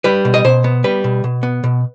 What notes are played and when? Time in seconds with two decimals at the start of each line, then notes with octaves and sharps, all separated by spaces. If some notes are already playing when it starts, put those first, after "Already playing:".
0.04 G3 B4
0.25 B2
0.34 D#5
0.44 B2 C5
0.64 B3
0.84 G3 B4
1.04 B2
1.24 B2
1.43 B3
1.64 B2